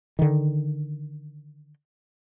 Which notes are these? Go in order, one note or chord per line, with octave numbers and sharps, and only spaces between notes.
D3 D#3